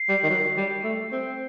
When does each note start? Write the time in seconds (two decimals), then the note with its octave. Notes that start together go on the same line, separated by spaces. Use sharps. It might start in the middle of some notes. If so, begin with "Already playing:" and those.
Already playing: C7
0.09 G3
0.23 D#3
0.30 F#3
0.57 G3
0.84 A3
1.12 C4